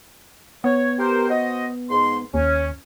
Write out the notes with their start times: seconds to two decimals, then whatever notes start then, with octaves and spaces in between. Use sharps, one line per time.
0.64 B3 C#5
0.99 G4 A#4 C5
1.29 F#4 C5 D#5
1.90 G#2 C6
2.34 D#2 C#4